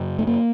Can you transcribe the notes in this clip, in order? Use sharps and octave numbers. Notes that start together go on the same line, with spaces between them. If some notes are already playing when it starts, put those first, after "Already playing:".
Already playing: F#2 C#3
A3
A#3